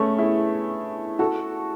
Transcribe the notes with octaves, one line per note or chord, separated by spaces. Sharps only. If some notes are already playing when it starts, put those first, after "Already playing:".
Already playing: A3 C#4 G#4 B4
E4 G#4
F#4 A4